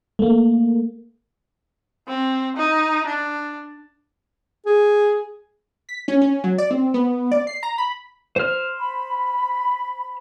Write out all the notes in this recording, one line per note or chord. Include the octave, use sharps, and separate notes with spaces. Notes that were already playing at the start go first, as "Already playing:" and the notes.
A3 A#3
C4
D#4
D4
G#4
B6
C#4
C#4
F#3
D5
C4
B3
D5
C7
A#5
B5
C5 F6
B5